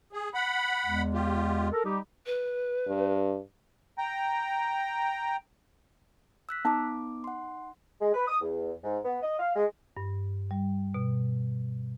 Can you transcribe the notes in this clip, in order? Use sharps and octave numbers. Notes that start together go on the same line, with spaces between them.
G#4
F#5 B5
E2 G#3
F4 G4
A4 A#4
G3 D#4 G4
B4
G2
G5 A#5
E6 F#6 B6
B3 D#4 A5 D6
F#5 C6
G#3
B4
D#6
E2
G#2
B3
D#5
F5
G#3
G2
G3
B2